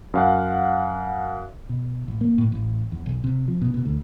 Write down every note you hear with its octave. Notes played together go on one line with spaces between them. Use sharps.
F#2 F5 F#5
B2
A1
A#3
A2
A1
E2
B1
C3
F3
B2
B2
D2